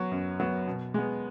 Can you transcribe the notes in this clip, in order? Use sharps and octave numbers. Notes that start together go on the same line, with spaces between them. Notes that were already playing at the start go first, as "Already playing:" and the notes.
Already playing: F#3 B3 C#6
F#2
F#3 B3
B2
G#3 B3